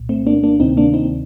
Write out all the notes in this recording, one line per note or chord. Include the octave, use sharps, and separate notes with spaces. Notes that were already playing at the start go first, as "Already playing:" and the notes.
Already playing: C2 A#2
A3 C4
A#3 D4
A#3 D4
D2 C3 D#3 C4 D#4
A#3 D4
C4 D#4